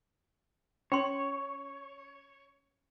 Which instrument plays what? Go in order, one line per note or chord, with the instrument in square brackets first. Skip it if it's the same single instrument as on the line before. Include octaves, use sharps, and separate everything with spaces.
[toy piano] C#4 C6 [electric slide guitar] C#5